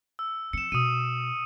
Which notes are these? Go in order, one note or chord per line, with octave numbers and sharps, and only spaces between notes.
E6
F3 C4 C#7 E7
B2 D#6 D#7